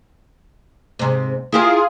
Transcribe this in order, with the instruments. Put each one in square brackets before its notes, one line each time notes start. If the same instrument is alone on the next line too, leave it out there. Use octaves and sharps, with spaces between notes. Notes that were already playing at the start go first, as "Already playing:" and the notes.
[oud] G#2 C3
[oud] E4 G4 A#4 [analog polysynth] F4 G#4